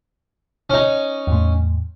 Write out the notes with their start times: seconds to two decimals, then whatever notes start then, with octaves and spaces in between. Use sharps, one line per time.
0.70 C#4 D#4
1.27 E2 A2